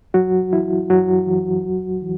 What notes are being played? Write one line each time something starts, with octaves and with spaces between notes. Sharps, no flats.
F#2 F#3 F#4
E3 E4
F#2 F#3 F#4
E3
E2
E3